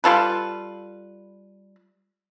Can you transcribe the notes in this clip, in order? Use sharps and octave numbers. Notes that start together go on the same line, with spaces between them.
G3 F4 A4 B4